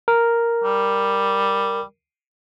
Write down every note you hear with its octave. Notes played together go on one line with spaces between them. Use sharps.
A#4
G3